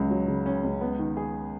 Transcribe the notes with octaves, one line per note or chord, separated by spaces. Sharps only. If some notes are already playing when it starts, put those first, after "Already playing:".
Already playing: C#2 C#3 F#3 C#4
F#3
C#3
C#4
C#2
B3
D#3
G#4